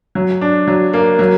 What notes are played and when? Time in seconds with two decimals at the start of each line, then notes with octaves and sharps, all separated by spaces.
0.15 F#3
0.41 D4
0.67 F#3
0.93 A#3
1.19 F#3